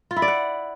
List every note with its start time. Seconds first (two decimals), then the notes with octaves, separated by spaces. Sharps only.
0.11 F4
0.16 E4
0.22 D5
0.28 F#5